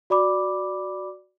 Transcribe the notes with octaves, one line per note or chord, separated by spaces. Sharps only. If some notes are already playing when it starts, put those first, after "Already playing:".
F#4 D5 B5 D6